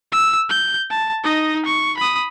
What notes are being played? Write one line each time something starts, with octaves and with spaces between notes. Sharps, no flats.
E6
G6
A5
D#4 D#5
C#6
B5 D#6